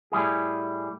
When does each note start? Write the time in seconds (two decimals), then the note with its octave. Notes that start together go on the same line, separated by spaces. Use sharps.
0.12 A2 G3 E4 G#4